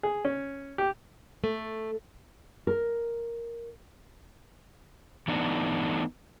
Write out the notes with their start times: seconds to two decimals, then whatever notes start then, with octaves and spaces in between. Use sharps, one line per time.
0.03 G#4
0.25 C#4
0.78 G4
1.44 A3
2.67 A#4
5.28 E3 A3 B3 D4 D#4